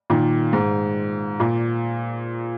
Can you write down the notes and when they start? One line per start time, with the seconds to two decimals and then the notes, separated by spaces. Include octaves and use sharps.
0.10 A#2 D#3
0.53 G#2
1.40 A#2